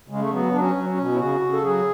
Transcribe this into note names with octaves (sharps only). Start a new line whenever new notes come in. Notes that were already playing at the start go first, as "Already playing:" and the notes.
C#3 G#3
A3
F#3 B3
F#3 D4
C#4
F#3
C#4
B2
E4
C#3 F#4
C#3
A4
F#3 G#4